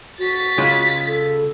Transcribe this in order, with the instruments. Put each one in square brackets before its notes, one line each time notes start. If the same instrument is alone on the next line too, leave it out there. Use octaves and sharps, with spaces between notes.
[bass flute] F#4 [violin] A6 B6
[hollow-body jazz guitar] C#3 G#3 F4
[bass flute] A4